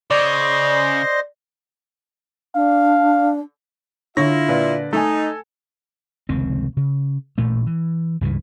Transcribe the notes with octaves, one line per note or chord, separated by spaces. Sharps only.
C#3 C5 D5 D#5 C6
D4 F5
D3 E4 F4 C#5 E5 A#6
A#2 B4 D5
A3 D#4 A4 G#5
F1 C#2 D#3 C4
C#3
A1 A#2 A3
E3
C#2 G2 C#3 E3